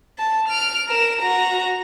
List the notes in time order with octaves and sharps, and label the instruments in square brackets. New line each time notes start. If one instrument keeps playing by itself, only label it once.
[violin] A5
F6 D7
A#4 E7
F#4 A#5